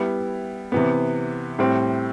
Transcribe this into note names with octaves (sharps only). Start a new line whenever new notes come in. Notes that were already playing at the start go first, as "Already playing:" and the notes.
Already playing: G3 B3 E4
C3 E3 B3
A2 G3 C4